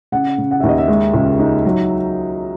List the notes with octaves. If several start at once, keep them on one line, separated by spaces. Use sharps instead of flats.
C#3 F#5
C#3
F#5
D#2 E5
D#5
E5
G#3
C#2
D#4
F#3